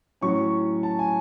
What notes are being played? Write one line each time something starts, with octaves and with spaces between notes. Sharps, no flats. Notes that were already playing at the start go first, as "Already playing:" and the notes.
A2 F#3 C#4 C#6
A5
G#5